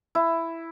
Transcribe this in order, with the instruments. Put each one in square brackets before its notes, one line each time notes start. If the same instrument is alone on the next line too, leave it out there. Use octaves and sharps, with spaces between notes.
[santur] E4